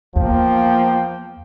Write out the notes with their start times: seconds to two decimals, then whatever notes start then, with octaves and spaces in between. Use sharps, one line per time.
0.16 E2 F3 A#3 G5